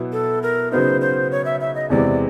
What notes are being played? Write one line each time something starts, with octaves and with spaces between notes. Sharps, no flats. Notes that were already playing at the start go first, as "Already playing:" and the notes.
Already playing: B2 F#3 B3 E4
A4
A#4
C#3 F#3 B3 D#4 C5
C5
C#5
E5
E5
D#5
E2 C3 E3 G#3 D5